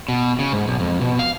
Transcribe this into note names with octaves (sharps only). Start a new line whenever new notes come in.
B2
C#3
G#2
B1
F2
B2
F5